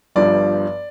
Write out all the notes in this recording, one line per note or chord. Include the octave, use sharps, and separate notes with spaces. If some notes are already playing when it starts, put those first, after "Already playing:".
G1 G2 F3 D5